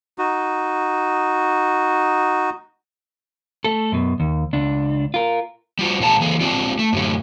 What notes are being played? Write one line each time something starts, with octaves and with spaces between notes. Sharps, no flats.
D#4 F#4
A3 A4
F#2 B2
D#2
C#2 D4
F4 A#4
G3 F4 F#4
A#2 G#3 A4 B4 A5 A#5
E3 A#3 G#4 A4
G#3 C4 D4 F4
A3
F#2 A2 D3 A3